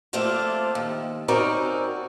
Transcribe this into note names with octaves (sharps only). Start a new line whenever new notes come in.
F3 A3 A#3 C4 D4 F4
D#2
C4 C#4 D#4 F#4 A#4 D5